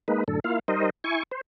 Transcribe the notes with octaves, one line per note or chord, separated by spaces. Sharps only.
G#3 A#3 D#4 B4
F#2 A2 D3 A4
A#3 E4 F4 F5
G3 D#4 A#4 C5 D#5
E4 G#5 C#6
C5